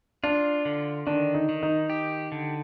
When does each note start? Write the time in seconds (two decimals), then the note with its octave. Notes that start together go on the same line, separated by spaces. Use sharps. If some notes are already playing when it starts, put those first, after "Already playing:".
0.23 D4 F4
0.65 D3
1.07 D#3 D4
1.35 D#4
1.49 D#3
1.63 D#4
1.90 G4
2.32 D3